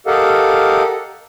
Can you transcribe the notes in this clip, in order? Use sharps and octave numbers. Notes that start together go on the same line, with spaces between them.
G4 A4 A#4 D#5 F5 F#5